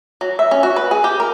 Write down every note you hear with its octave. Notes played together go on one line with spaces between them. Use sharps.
F#3
E5
C#4
F#4
B4
G#4
G4
A#4